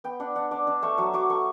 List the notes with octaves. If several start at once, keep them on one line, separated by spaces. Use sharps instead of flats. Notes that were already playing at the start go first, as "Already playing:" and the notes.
B3 G5
D4 F#5
D4 F#5
D4 D5
D4 A5
A3 C#6
F#3 C#6
F#3 D6
A3 C#6